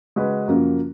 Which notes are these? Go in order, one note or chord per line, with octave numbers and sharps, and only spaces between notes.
C#3 G#3 C#4 F#4 B4
F#2 C#3 F3 A#3